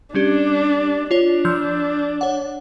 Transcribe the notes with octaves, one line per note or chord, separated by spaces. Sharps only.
G3 C#4 D4 G4
D4 F4 C#5
F3 E6 G6
C#5 F#5